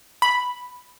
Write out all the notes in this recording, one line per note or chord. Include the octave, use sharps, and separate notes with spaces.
B5